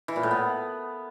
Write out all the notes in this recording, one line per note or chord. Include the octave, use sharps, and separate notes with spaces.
E3
A#2
A2
B3